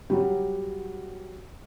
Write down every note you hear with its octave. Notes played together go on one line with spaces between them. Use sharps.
F#3 G3